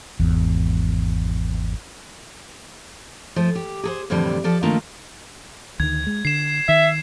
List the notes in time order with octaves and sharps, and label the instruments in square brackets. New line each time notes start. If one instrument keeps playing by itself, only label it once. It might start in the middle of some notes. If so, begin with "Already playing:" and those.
[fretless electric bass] G#1 E2
[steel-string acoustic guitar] F3 A3
G4
G#4 A4 C5
F2 A2 D3 E3 G3
F3 A4 D5
D#3 F3 A3 A#3 D4 F4
[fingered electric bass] D2 D#3 [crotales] G#6
[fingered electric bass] G#3
[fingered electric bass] D3 [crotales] C7 E7
[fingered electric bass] D#3 [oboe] E5